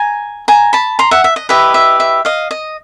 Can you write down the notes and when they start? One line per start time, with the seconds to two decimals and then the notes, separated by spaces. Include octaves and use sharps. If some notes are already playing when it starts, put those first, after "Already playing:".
Already playing: G#5 A#5
0.48 G#5 A#5
0.73 A5 B5
0.99 A#5 C6
1.11 E5 F#5
1.24 E5
1.36 D#5
1.49 E4 G4 B4 D#5 E5
1.74 E5
2.00 E5
2.25 D#5 F5
2.51 D#5